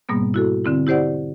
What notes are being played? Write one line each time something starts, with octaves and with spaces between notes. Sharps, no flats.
G#2 B2 G3 A#3 B3
E4 F#4 A4
D3 C4 E4
E4 G4 C5 D5 F#5